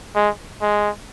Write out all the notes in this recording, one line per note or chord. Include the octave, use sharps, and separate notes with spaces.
G#3
G#3